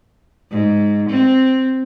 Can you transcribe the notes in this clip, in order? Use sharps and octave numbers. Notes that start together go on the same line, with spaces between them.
G#2
C4